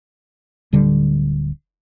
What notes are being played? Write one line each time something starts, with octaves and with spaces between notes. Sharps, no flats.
D1 D3 G3